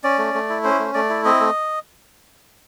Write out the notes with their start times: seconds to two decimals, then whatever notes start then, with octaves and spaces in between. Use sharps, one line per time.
0.04 C#4 D5
0.18 A3
0.34 A3
0.50 E4
0.64 C#4 C5
0.79 A3
0.94 A3 D5
1.10 E4
1.25 C4 D#5
1.41 A3